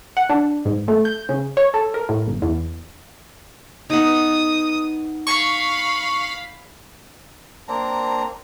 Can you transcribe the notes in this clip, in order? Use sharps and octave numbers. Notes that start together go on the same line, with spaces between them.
F#5
D4
G#2
A3
G6
C#3
C#5
A4
A#4
A2
G1
E2
B3 D#4 D#6
F5 B5 C#6
A#3 C4 D4 A#5